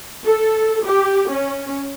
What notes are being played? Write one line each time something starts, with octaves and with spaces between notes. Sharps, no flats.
A4
G4
C#4